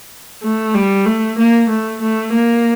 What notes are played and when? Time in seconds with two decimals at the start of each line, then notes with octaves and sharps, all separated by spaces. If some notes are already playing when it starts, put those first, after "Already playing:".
0.43 A3
0.74 G3
1.06 A3
1.38 A#3
1.69 A3
2.01 A3
2.32 A#3